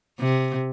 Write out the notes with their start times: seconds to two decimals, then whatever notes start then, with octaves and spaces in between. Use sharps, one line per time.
0.19 C3